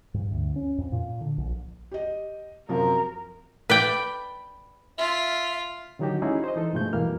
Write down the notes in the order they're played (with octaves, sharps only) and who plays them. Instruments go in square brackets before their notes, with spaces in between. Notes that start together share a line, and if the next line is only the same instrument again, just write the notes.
[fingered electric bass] G2
D2
C#4
F2
A#2
D3
A#1
[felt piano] G4 D#5
[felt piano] F#2 C3 F3 [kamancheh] A#4
[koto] B4 D5 G5
[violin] F4 [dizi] E5
[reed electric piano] D3 D#3 F#3 D#4 F#4 G4
G#3 C#4 D#4 E4 F#4 G#4
C5 D#5
E3 D#4 A4
G2 B2 F3 G#3 A3 G6
F2 B2 E3 G3 A#3 F6